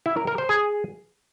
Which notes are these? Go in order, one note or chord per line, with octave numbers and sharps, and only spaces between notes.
E4
A#4
A#4
C5
G#4